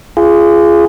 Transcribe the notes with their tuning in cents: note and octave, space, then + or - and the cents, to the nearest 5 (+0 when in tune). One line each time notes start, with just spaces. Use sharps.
F4 -30 G#4 +0